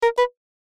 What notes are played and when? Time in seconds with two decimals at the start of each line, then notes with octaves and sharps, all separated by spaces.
0.03 A#4
0.18 B4